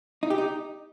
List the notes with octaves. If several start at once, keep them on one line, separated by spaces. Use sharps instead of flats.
D#4
G4
D#4